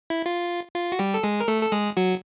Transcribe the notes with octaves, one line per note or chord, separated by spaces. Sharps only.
E4
F4
F4
F#4
G3 G4
A4
G#3 G#4
A#4
A3 A4
A4
G#3 G#4
F#3 F#4